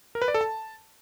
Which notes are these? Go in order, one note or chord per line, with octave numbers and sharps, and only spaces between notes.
A#4
B4
D5
A4
A5